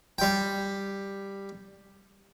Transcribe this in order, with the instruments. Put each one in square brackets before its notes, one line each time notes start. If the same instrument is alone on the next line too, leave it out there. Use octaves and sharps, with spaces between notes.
[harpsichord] G3 G5